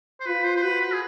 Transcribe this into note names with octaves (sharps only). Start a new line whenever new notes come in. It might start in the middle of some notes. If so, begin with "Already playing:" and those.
C5
F4 B4
C5
C5
F#4 B4
B4
G#4